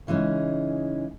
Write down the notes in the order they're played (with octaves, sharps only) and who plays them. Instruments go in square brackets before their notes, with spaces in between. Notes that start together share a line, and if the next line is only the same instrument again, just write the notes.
[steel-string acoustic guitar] C#3 E3 G#3 C#4 D#4